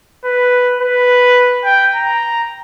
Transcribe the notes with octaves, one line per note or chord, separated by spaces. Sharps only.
B4
B4
G5
A#5